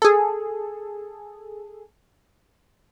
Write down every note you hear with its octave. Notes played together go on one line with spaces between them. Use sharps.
G#4 A4